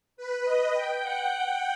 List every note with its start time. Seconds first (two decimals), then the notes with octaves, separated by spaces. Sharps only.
0.17 B4
0.45 D#5
0.73 G5
1.02 F#5